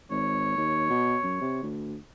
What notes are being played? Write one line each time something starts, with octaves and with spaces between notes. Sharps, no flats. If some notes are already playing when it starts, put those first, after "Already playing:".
G#1 C#5
D#2
B2
F#2
C3
D2